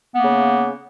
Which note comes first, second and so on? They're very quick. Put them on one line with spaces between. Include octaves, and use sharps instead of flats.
B3 A#3 C#3